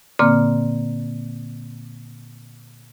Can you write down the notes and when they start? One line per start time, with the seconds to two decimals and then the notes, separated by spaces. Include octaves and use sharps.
0.19 A#2 D3 A#3 C4 F6